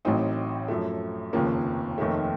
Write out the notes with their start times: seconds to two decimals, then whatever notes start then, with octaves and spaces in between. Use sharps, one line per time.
0.05 A1 A2 F#3 C4 D#4
0.68 F#2 F3 A3
1.33 F1 D#2 C#3 F3 A#3
1.98 F1 D#2 D#3 A3